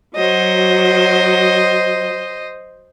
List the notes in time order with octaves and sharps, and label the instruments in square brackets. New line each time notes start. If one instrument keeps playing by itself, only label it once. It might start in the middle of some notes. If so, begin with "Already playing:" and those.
[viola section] F#3 [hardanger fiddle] C5 D#5